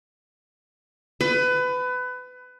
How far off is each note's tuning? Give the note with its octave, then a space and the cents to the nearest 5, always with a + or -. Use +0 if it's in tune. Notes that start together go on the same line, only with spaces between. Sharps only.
B4 +25